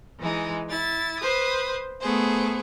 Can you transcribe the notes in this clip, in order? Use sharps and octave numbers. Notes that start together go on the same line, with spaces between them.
E3 G#3 D#4
E4 A6
B4 C5 D#6
A3 B3 G#4 C5